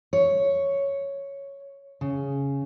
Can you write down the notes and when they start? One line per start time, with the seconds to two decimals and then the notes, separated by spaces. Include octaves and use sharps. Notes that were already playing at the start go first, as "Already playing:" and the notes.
0.13 C#5
2.01 C#3